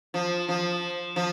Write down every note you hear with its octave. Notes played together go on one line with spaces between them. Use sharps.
F3
F3
F3